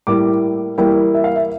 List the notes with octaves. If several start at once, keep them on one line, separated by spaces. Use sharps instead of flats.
A2 G3 A#3 E4 D6
E3 G3 A#3 E4 G5
E5
F5
E5